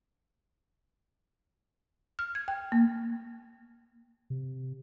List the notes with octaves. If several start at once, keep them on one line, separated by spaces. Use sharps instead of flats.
F6
G#6
G5
A#3
C3